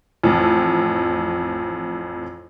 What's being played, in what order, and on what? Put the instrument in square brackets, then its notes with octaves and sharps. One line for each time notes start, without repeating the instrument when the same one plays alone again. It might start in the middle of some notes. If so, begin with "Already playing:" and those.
[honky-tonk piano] A1 F2